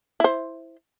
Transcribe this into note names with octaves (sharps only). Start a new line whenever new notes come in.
E4 C5